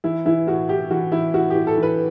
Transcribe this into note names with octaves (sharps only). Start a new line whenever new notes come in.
E3 E4
E3 E4
A2 F#4
A2 G4
E3 F#4
E3 E4
A2 F#4
A2 G4
A4
E3
B4